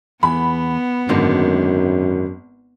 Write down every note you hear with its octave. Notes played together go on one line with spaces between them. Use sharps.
E2 B3 B5
G#1 F#2 D3 D#3 A#3